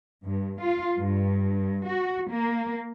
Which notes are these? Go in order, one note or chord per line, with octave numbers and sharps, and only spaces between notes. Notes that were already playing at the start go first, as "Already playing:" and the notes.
G2
F4
G2
F#4
A#3